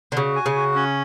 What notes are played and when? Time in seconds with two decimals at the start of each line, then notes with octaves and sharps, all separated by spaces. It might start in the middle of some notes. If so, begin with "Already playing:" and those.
0.12 D3
0.17 C#3 F#4
0.36 G#5
0.46 C#3
0.56 F#4
0.75 C#4